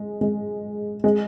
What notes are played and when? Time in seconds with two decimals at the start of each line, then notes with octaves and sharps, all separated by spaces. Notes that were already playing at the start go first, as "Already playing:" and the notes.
Already playing: G#3
0.21 G#3
1.04 G#3